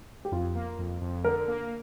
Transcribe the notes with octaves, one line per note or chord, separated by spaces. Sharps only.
G4
F2 F4
A#3
F2
F2
D3 A#4
A#3